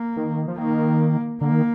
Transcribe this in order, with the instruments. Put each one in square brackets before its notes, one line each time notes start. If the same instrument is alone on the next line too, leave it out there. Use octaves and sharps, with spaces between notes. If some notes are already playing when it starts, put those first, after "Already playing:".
Already playing: [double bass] A#3
[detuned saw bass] D#3
F3
[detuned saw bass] D#3 [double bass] A#3
[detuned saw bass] D3 [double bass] A#3
[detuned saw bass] D#3